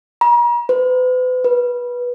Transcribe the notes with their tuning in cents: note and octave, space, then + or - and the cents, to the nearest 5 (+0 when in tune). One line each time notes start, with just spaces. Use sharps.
A#5 +40
B4 +40
B4 -20